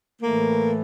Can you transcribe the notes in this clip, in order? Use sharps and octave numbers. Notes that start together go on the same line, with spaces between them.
A2 E3 A3 A#3